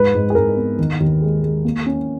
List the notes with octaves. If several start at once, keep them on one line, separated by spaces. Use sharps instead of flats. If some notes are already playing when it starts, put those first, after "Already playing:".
Already playing: G#2 B4
G#2
G#4
G#2 A#4
B3
D#3
D#2
G#3
G#3
A#3
C#4